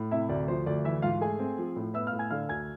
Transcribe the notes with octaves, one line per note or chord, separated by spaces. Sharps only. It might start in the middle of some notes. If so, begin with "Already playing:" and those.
Already playing: A2
C3 E4 E5
D2 D5
F3 C5
D2 D5
E3 E4 E5
G#2 F4 F5
A3 G#4 G#5
C4
F3
A2
B3 E5 E6
F5 F6
A2
G#5 G#6
D3 F5 F6
D2 G#5 G#6